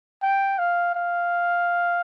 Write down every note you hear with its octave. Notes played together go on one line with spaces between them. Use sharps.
G5
F5
F5